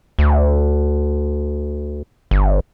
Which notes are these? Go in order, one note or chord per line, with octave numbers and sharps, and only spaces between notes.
D2
G1